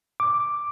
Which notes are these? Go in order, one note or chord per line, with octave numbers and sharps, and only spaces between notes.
D6